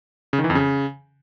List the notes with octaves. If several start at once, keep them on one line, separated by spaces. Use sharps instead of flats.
C#3
D#3
E3
F2
C#3